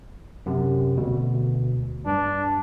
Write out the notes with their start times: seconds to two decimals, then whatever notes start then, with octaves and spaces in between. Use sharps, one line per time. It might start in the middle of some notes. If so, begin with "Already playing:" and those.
0.46 F#2 C3
0.97 D2 B2
2.06 G2 D4